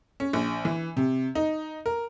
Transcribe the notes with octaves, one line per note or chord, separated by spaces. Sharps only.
C#4
A#1
E3
C3
D#4
A#4